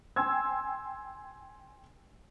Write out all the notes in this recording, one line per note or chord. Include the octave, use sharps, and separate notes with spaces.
G5 G#5 C6 E6 G#6